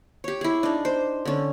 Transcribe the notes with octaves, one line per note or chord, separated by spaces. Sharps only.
G4 C#5
E4 G#4
D4 D#4
C5
D3 C#4